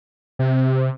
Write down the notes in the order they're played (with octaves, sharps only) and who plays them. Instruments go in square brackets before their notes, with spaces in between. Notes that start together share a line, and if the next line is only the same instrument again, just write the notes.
[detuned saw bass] C3